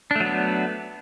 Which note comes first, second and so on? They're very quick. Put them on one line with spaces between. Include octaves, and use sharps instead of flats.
D4 A3 F#3 B3